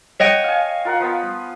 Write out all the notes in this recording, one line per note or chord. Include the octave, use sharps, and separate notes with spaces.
C#5 D#5 F#5 G5
F5 G#5
F4 A#4 F#5
F3 B3 B5